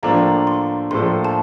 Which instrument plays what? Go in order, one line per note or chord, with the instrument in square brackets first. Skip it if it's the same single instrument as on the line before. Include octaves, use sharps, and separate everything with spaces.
[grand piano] A2 F3 A#3 D4 A4 [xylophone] A#5
[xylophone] C6
[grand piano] A2 F3 A#3 D4 A4 [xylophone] C6
[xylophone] A5